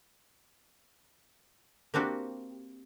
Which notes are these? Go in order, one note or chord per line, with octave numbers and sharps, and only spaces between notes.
A#3 C4 D4 F#4 G4